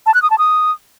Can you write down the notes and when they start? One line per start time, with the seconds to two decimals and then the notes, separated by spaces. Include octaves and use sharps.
0.06 A5
0.14 F#6
0.22 D#6
0.30 A5
0.38 D#6